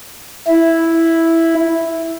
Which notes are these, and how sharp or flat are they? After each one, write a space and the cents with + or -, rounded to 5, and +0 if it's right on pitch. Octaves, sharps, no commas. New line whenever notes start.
E4 -5